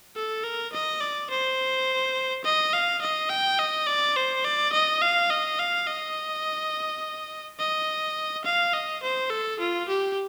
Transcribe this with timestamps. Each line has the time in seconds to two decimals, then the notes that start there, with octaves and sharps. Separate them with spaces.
0.16 A4
0.44 A#4
0.73 D#5
1.01 D5
1.30 C5
2.44 D#5
2.73 F5
3.02 D#5
3.30 G5
3.58 D#5
3.87 D5
4.16 C5
4.45 D5
4.72 D#5
5.02 F5
5.30 D#5
5.59 F5
5.87 D#5
7.59 D#5
8.44 F5
8.73 D#5
9.03 C5
9.30 A4
9.59 F4
9.88 G4